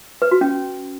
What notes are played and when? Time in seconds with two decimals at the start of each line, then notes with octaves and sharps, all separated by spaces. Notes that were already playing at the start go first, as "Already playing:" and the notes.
0.22 B4
0.31 F#4
0.41 C#4